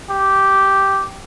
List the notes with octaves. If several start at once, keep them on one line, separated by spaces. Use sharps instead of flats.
G4